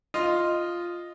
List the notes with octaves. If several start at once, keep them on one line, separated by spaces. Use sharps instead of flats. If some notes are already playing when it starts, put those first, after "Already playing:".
F4 D#5 C6 F6